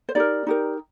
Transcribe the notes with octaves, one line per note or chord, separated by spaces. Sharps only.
C5
D#4 G4 A#4 D5
D#4 G4 A#4